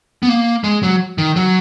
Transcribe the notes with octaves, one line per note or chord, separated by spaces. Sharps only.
B3
A#3
G#3
F#3
D#3
F#3